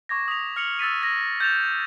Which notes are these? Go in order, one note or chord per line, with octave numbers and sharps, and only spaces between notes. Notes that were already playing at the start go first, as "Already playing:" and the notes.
C#6 D6 G#6 A#6
D#6 B6 F7
F6 C#7 F7 F#7
E6 A6 B6 D#7
G#6 A#6
G6 A6 E7 F7